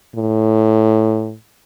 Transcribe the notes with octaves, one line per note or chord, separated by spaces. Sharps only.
A2